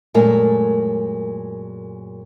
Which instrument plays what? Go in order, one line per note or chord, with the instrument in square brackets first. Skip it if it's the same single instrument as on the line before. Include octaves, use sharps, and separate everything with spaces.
[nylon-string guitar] F#2 A#2 G#3 A3 A#4